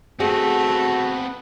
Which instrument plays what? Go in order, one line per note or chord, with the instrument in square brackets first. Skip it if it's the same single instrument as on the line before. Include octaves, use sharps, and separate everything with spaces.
[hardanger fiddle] A3 [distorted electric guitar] B3 C4 [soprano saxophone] F#4 [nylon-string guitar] G#4